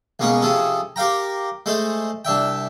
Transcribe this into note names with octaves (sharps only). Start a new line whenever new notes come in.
C#2 B2 A#3 C#4 G#4 C#5
C3 F3 C#4 G#4 A4
G4 A#4 F5 G5 A#5
G#3 A3 A4 C5
C2 D4 E5 G5